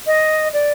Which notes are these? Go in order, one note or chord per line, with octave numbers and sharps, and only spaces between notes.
D#5
D5